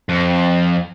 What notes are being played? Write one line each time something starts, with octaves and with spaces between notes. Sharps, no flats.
F2